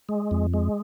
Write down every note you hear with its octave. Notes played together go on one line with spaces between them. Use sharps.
G#3
F2
G#3